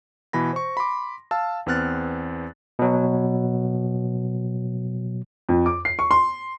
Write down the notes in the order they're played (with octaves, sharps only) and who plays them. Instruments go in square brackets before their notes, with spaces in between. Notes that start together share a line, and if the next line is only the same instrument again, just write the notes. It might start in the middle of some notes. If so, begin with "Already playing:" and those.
[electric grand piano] B2 E3 B5 A#6
C5 C#6
B5 C6 D6
F5 A5 E6
E2 B3 C4 F6 F#6 A6
[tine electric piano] B2 F#3
[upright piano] F2
D6
C7
C#6
C6